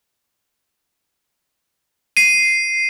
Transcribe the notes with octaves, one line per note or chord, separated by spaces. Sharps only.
C7 D#7